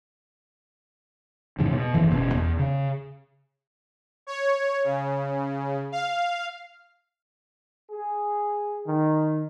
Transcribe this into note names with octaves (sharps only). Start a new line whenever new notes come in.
F2 G#2 C#3 E3
B2
F#1 F#2 E3
F#1 B2 B3 C#4
E2
C#3
C#5
C#3
F5
G#4
D#3